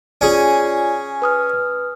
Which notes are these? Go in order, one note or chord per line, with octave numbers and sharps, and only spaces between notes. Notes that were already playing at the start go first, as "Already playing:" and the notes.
C#4 F4 G#4 C#5 D5
B4 D#6 F6